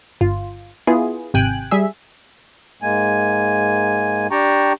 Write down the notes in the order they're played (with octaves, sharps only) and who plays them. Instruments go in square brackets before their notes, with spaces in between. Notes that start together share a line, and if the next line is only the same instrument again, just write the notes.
[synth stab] G1 F4
B3 E4 F4 G#4
G#1 C3 G5 G#5 F#6
G3 G#4 E5
[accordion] G#2 G#3 A#3 G#5
D4 G4 G5 A5 A#5 C#6